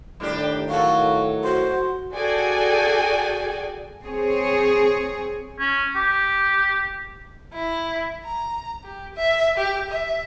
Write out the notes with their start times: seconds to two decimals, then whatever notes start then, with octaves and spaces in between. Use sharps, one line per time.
0.20 A2 D#3 G3 D4 G4
0.70 F#3 F#4 A4 F5
1.44 F#4 C5
2.14 F#4 G#4 A4 D5 G5 G#5
4.02 C4 G#4 C#5
5.59 C#4
5.96 G4
7.54 E4
8.25 A#5
8.84 G4
9.15 E5
9.58 G4
9.90 E5